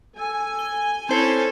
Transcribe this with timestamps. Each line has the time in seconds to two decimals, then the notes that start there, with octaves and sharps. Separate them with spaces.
0.18 A4 G#5
0.59 G7
1.09 C4 C#4 E4 A4 C5